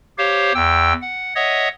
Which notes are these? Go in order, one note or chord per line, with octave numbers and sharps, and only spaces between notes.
G4 C5 C#5 F5
E2 G5 E6
F#5
C#5 D#5 E5 F#5 D#6